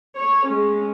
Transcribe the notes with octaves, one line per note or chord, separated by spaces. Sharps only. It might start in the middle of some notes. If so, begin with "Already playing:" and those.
C#5
G#3 C#4